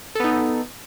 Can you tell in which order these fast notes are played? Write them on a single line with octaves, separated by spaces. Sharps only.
A4 B3 D#4